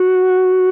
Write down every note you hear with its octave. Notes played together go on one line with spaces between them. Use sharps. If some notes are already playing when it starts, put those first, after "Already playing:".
Already playing: F#4